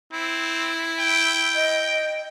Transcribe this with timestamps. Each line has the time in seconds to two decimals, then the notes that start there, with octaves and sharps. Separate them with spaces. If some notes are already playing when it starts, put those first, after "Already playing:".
0.12 C4 E4
0.99 G5
1.55 D#5